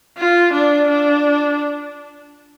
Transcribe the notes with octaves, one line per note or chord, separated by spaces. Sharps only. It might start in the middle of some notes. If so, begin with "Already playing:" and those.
F4
D4
D4